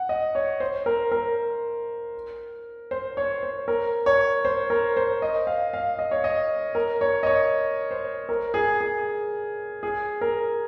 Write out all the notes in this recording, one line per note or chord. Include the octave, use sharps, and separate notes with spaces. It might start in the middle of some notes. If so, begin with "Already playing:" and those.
Already playing: F#5
D#5
C#5
C5
A#4
A#4
C5
C#5
C5
A#4
C#5
C5
A#4
C5
D#5
F5
F5
D#5
C#5
D#5
A#4
C#5
D#5
C#5
C5
A#4
G#4
G#4
G#4
A#4